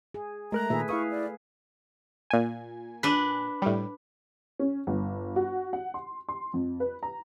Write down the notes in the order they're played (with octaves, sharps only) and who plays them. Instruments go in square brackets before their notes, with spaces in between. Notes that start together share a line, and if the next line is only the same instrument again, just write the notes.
[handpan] G#4
[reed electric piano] G#3 A#4 F#6 [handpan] A3 [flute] A#5
[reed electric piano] A#2 D#3 [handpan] G#4 B4 E5
[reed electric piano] E4 D#6 [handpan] B4 F5 [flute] C#6
[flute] D5
[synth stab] A#2 G#5
[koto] D4 B4
[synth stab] A2 G3
[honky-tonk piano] C#4
G1
F#4
F#5
C6
C6
F2
B4
A#5